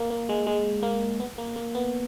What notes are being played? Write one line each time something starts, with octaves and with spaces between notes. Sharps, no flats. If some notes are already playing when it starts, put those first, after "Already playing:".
Already playing: A#3
A#3
G#3
G#3
A#3
B3
A#3
A#3
B3